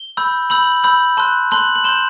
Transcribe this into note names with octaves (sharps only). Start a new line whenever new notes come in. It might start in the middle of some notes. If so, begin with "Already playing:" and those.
Already playing: G7
B5 E6 G6
B5 E6 G6 F#7
B5 E6 G6 F#7
A5 C6 F#6
A5 C6 F#6 F#7
F#7
C6 G6 E7